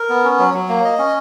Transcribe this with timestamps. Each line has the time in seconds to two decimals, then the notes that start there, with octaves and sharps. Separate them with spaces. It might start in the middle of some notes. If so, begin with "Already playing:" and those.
Already playing: A#4
0.09 B3
0.24 C#4
0.39 F#3
0.54 F#3
0.69 A#3
0.85 D#5
0.99 C#4